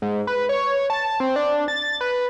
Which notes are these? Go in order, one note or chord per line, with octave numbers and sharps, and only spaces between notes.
G#2
B4
C#5
A5
C4
D4
A6
B4